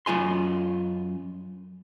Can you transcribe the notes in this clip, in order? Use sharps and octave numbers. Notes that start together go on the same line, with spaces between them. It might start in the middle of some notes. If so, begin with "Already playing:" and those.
F#2 F4 G#5 C6